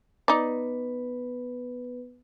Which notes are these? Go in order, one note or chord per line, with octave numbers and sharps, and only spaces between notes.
B3 D#4 B4 D5